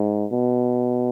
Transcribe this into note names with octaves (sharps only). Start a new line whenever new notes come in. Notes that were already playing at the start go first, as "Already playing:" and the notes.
Already playing: G#2
B2